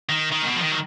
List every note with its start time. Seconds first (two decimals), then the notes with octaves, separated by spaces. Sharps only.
0.09 D#3
0.32 D#3
0.42 A#2
0.46 B2
0.56 F3
0.61 D#3
0.71 F#3